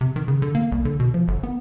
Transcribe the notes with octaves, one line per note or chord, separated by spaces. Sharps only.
C3
D#3
C#3
D3
A#3
C2
D3
B2
F3
G1
B3